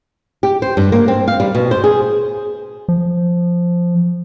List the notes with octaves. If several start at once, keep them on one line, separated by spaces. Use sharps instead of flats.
G4
C5
G2
A#3
C4
F5
G3
B2
C5
G#4
F3